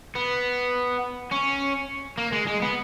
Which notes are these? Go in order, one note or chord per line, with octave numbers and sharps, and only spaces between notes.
B3
C#4
A#3
G#3
G#3
B3